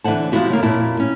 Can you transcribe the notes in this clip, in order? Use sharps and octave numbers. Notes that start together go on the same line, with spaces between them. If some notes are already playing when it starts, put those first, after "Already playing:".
D3 E3 C5 F#5 A5
F3 G#3 E4 F#4 G4
C#3 A#3
F2 A#2 E4 A5
C#4